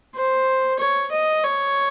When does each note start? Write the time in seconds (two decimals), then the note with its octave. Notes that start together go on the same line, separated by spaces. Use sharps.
0.15 C5
0.79 C#5
1.12 D#5
1.44 C#5